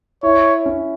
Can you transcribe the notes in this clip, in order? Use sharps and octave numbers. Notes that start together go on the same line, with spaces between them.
E4 C#5
C#4